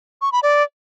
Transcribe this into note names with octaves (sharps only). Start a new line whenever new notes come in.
C#6
B5
D5